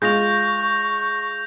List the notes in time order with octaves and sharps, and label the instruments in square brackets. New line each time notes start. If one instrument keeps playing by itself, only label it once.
[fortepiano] G#3 F4 [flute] C#6 [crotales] G6 A#6 F7